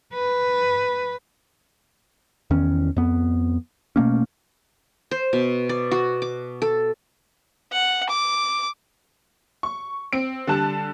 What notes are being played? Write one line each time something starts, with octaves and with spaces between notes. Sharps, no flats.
B4
E2 D#3 C#4
F2 B3
B2 A3 A#3 C#4
C5
B2
D5
F#4
D6
A4
F#5
D6
C#6
C4 D7
D3 G3 A5 F#6